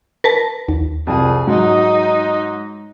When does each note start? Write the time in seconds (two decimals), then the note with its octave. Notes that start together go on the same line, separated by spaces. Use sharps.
0.24 A#4 B4 A5
0.68 D#2
1.07 C2 F2 G#4
1.47 G#2 F#3 D#4